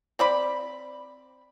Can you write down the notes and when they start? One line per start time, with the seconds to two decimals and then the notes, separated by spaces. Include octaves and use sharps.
0.19 C4 D5 B5